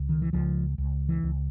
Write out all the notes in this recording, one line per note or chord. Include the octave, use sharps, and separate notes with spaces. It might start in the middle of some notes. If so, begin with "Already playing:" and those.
Already playing: C#2
D#3
E3
C#2 F3
C#2
E3
C#2